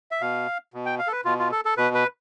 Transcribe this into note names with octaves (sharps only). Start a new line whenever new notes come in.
E5
B2 F5
B2
G5
F5
A4
B4
B2 F4
F4
A4
A4
B2 B4
B4